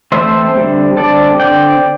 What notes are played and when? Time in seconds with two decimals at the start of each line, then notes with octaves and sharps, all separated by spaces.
0.12 E3 A3 C4 C5 E5
0.54 D3 G3 C4
0.97 D3 G3 C4 A4 D5
1.40 D3 C4 D5 G5